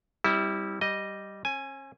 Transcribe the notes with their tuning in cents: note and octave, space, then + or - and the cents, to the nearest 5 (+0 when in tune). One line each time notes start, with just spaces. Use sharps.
G3 +0 C4 +20 E4 -25
G3 -10 D#5 +0
C#4 -45 G#5 +0